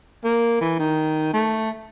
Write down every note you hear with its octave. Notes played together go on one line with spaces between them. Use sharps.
A#3
E3
D#3
A3